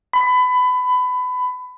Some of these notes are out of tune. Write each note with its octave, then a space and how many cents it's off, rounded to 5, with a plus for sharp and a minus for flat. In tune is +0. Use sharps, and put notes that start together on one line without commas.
B5 +25